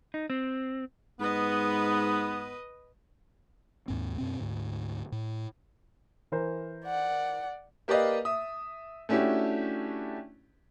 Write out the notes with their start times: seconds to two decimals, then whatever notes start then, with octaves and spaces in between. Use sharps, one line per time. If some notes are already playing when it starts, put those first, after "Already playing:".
0.14 D#4
0.30 C4
1.20 G#2 B3 B4 D#5
3.88 D#2 G#2 C4
4.18 F#2 B2 C4
4.39 D2 G#2
5.12 A2
6.32 E3 A#4 C5
6.85 D5 F#5
7.88 A#3 G4 B4 D5 D#5 F5
8.25 E5 D#6
9.09 A3 C#4 D4 E4 F#4 G4